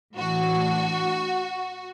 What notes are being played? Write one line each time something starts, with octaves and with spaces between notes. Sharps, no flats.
A2 E3 D4 F#4